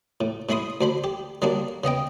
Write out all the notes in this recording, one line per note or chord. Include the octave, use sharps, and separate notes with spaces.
A2
A2 G#3 E4 B5 C6 D#6
D2 D4 C5 B5
G4
D3 F#3 G3 A#3 D4
C#3 B3 D#5 G5